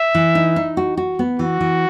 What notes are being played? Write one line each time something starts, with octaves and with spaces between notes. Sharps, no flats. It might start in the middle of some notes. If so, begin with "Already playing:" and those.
Already playing: E5
E3
D#4
D#4
F#4
F#4
B3
E3 F#4
E3